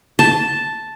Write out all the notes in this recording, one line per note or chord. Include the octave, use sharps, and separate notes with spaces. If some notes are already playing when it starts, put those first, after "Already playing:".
A5